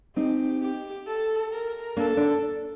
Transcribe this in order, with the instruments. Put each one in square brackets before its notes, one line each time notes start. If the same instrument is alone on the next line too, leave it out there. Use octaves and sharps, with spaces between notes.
[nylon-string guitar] C4 D#4 [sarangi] G4
[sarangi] G4
A4
A#4
[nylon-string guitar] A#3 D4 [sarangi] A4
[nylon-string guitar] D4